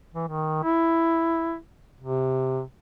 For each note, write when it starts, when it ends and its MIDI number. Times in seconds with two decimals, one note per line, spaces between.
0.14 0.28 52
0.28 0.59 51
0.63 1.56 64
2.01 2.62 48